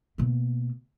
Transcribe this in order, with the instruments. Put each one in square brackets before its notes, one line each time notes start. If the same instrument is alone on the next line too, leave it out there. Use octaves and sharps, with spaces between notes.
[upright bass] B2 A#3